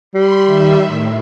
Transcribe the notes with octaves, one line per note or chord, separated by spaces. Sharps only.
G3 B5 C6
D#3 E5
A2